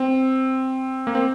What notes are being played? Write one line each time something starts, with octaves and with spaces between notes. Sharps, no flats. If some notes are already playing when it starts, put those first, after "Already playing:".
Already playing: C4
A#3
C4